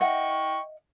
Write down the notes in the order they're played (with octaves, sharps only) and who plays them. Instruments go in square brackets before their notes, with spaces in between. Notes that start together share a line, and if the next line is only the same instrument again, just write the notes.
[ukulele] D#5 E5 F#5 [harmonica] G5 C#6